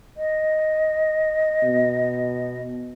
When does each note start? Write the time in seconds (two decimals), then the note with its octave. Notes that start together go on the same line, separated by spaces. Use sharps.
0.17 D#5
1.63 B2